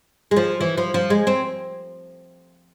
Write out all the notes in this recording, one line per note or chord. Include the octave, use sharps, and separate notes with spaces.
G#3
F3
E3
F3
F3
G#3
C4